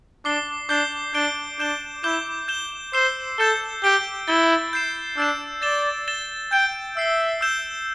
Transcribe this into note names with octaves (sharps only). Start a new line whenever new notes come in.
D4 D6 C7 G7
D4 D6 G6 C7 G7
D4 G6 D7 G7
D4 G6 E7 G7
E4 D6 G6 E7 G7
G6 E7 G7
C5 E6 C7 E7 G7
A4 G6 E7 G7
G4 G6 D7 G7
E4 A6 D7 G7
G6 C7 E7
D4 E6 G6 E7
D5 A6 E7 G7
A6 E7 G7
G5 G6 D7 G7
E5 E6 C7 G7
E6 G6 E7 G7